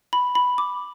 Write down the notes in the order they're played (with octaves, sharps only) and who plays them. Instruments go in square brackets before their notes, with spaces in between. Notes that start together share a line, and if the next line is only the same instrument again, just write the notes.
[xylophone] B5
B5
D6